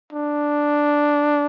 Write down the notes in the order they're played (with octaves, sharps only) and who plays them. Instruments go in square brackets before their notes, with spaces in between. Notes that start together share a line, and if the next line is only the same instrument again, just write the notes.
[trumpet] D4